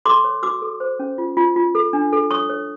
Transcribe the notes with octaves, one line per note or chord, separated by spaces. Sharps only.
A4 C6 D6
C#5
F#4 D6 E6
A4
C5
C#4
F4
F4
F4
A4
D4
A4
C#5 C#6 D#6
C#5